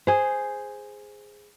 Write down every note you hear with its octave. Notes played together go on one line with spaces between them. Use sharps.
G#4 C5